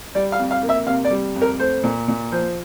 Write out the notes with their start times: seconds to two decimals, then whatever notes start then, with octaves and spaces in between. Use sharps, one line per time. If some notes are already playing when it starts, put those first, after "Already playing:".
0.15 G3 D5
0.32 F5
0.39 F2
0.51 F5
0.63 A#3
0.69 E5
0.87 C3 F5
1.05 D5
1.10 G3
1.36 F2
1.42 A#4
1.59 A3 C5
1.84 A#2
2.08 A#2
2.32 F3 C5